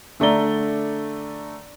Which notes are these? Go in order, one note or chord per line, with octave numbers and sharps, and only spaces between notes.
D3 A3 D5 A#5 G7